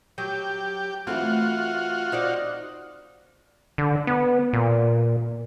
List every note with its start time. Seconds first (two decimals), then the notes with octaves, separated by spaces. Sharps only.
0.18 F#3 G4
1.07 E3 A3 C4 F4 F#4
2.12 D#4 C5 D5
3.78 D3
4.07 B3
4.53 A#2